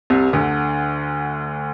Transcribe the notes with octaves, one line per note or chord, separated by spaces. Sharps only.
C2 C3
D2 D3